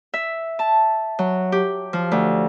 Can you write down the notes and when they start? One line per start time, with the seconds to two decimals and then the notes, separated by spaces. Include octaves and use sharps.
0.14 E5
0.59 A5
1.19 F#3
1.52 G4
1.93 F3
2.12 D2